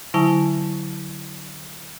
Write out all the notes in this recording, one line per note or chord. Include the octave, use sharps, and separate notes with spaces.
D3 F#3 E4 G#5 A5